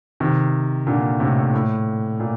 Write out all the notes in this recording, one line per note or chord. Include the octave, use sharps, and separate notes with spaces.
C3 D#3
A#2 D3
A2 C3
A2
A#2